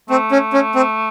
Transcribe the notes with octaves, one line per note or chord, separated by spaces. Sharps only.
A3 C4
C#4
C#4
C4